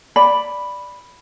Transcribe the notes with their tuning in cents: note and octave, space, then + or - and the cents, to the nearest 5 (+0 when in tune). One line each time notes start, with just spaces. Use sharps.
D5 +0 B5 +0